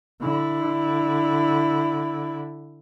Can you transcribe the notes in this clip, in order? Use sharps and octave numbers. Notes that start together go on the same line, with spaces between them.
D3 E4